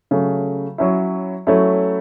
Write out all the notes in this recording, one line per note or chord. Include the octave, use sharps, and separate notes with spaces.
C#3 F#3 A3
F#3 C#4 E4
F#3 A3 C#4 E4